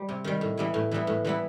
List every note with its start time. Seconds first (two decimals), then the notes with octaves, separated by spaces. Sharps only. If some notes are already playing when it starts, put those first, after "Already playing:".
Already playing: G3
0.09 C3
0.24 D#3 G3
0.41 A2
0.58 E3 G3 B3 E4
0.74 A2
0.91 E3 G3 B3 E4
1.07 A2
1.25 E3 G3 B3 E4